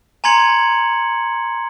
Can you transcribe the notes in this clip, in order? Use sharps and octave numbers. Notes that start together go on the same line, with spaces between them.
G#5 A#5 C6 G#6 C#7 F#7